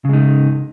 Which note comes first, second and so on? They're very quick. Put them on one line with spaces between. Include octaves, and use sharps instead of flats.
C#3 G#3 D#4